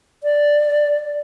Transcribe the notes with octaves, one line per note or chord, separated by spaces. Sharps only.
D5